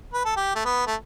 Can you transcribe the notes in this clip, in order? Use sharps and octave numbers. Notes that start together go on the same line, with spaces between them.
B4
A4
G4
A3
B3
A3